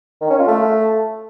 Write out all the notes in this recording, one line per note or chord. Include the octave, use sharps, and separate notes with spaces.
D#3
C#4
F4
A3